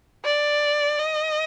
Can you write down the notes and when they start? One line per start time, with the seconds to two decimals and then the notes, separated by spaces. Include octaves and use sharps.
0.25 D5
0.99 D#5